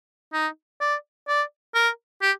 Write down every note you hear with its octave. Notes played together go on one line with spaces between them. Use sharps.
D#4
D5
D5
A#4
G4